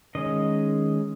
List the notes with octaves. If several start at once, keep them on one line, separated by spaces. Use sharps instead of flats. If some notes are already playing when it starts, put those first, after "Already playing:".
D#3 G#3 C#4 D#5